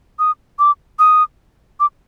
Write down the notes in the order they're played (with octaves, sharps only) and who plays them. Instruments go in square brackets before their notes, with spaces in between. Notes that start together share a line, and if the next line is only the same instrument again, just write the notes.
[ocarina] D#6
D6
D#6
D6